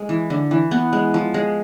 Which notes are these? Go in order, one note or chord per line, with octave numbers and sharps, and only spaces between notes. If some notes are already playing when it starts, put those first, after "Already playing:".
Already playing: G#3
E3
D3
E3
B3
G#3
F3
G#3